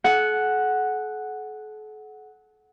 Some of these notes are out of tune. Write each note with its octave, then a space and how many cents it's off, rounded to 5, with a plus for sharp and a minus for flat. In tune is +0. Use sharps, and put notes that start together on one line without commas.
A4 -45 F#5 +0